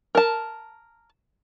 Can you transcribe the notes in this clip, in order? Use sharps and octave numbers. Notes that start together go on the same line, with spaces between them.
A#4 A5